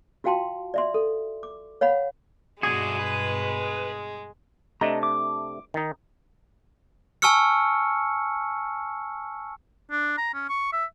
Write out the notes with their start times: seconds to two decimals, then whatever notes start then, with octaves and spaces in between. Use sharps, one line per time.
0.24 F4 F#4 F5 G5 A5 C6
0.74 D5 E5 C6
0.94 A4
1.43 D6
1.81 C#5 F5 F#5 B5
2.63 G2 B2 G#3 D4 F#4 G#4
2.99 B4
4.81 C3 A3 D4 D#5 A#5
5.03 D6
5.74 D#3 D#4
7.22 G#5 A5 C#6 E6 F6 C#7
9.91 D4
10.18 A#5
10.34 C#4
10.49 C#6
10.73 E5